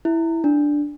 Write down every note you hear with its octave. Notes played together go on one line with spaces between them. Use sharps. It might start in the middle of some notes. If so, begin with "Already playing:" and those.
E4
D4